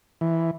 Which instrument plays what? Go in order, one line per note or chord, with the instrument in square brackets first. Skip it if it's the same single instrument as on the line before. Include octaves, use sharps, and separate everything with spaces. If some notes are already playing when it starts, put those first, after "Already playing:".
[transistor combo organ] E3